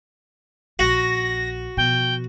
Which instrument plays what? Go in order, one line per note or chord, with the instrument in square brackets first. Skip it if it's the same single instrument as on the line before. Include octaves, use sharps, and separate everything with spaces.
[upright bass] A#1 [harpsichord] F#4 [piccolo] A#6
[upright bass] B2 F3 [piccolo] G5